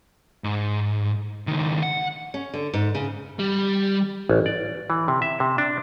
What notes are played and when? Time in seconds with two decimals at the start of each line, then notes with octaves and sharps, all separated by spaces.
0.44 G#2
1.47 C#2 D#3
1.83 F#5
2.34 C#4
2.54 D3
2.73 G#2
2.95 C#3
3.39 G3
4.29 A1
4.46 D5
4.90 E3
5.08 C3
5.22 E5
5.40 C3
5.58 D4